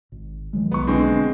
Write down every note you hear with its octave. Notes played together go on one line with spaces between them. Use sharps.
G#1
D#3 F#3 G#3
B1 B3 C#6
D3 G#3 C4